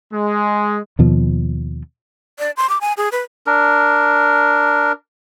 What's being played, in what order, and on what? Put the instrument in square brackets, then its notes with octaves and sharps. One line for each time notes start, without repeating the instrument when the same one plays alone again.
[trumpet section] G#3
[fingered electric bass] D#2 B2 F3
[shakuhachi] D5
C6
D6
G#5
G#4
B4
[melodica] D4 A#4